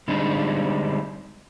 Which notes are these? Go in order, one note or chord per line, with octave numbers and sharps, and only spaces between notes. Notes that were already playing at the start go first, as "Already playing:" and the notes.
D3 G3 G#3 C4 D4 D#4